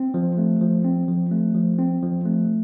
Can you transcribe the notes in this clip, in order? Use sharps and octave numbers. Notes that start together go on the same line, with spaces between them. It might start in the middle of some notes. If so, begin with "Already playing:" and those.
Already playing: C4
F3
A3
F3
C4
F3
A3
F3
C4
F3
A3